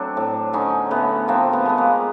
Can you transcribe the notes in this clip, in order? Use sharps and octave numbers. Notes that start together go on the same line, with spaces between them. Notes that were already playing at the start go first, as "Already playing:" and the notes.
Already playing: F#3 A3 C4 D4
A2
D3 C#4 D#4
D3 A3 B3
F3 A#3 C4
A3 B3
G#3 B3
A#3